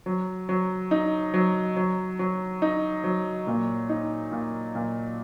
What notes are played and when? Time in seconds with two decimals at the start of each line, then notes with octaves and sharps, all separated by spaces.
0.06 F#3
0.49 F#3
0.91 D#4
1.34 F#3
1.76 F#3
2.19 F#3
2.62 D#4
3.04 F#3
3.47 A#2
3.89 D#4
4.32 A#2
4.75 A#2